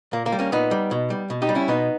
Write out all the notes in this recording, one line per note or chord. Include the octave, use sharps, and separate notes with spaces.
A#2 A#3
A#3
G3
A#3 C#4
A#2 B3 D#4
G3
B2
G3
B2
D#4 G4
G3
C#4 E4
B2 B3 D#4